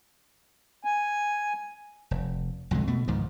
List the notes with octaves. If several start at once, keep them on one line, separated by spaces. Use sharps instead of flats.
G#5
F1
B1 F2 D3 G#3
B2 A3
C#2 G#2 D#3 F3